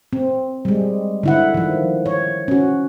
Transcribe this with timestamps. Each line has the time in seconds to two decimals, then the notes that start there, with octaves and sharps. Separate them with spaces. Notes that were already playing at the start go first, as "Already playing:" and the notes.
0.13 C4
0.65 G3 G#3
1.23 D3 E4 F#5
1.54 D#3 F3
2.06 C#5
2.48 C#4 F#4